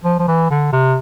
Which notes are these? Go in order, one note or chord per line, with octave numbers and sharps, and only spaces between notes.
F3
F3
E3
D3
C3